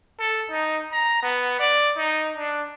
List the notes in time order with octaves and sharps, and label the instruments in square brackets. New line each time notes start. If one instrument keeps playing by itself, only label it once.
[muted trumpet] A4
D#4
A#5
B3
D5
D#4
D4